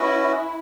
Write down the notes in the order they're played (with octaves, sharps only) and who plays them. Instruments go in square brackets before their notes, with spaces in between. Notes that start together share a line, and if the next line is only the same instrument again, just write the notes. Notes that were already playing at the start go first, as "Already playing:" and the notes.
Already playing: [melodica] C#4 F#4 B4 D#5 [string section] E4